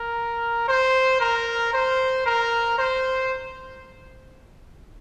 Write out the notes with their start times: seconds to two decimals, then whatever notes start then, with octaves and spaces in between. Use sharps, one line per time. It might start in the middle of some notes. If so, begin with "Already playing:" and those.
Already playing: A#4
0.68 C5
1.20 A#4
1.73 C5
2.26 A#4
2.78 C5